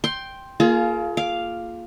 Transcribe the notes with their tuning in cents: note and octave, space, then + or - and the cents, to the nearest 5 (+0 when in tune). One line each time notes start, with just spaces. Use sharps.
G5 +0 C6 +10
A#3 +0 F4 -10 G#4 +30
F5 +0 D6 +0